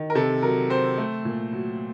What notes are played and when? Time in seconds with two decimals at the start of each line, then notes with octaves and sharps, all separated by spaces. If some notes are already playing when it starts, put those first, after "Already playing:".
Already playing: D#3
0.10 A#4
0.15 C3 A4
0.42 F#3 A#4
0.70 C4 C5
0.98 A3
1.25 A#2
1.53 F#3